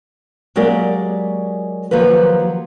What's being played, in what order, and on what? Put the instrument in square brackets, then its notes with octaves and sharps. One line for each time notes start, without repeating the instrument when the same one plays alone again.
[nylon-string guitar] F#3 G#3 A#3 G4 A#4 D5
D#3 F3 F#3 A#3 G4 B4